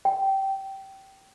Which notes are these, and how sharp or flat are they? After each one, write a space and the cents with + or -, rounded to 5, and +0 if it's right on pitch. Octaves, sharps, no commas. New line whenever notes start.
G5 -15